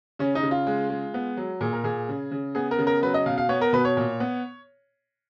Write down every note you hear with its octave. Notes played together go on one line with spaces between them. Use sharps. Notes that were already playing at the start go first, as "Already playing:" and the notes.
C#3 C#4
D#4
C#3
F4
G#3
G#3
B3
F#3
A#2 G#4
A#4
A#2 G#4
C#3
C#3
B3 G#4
A#4
C#3
A#4
F#3 B4
D#5
B2 F5
F5
B3 C#5
A#4
B2 B4
C#5
A#2
B3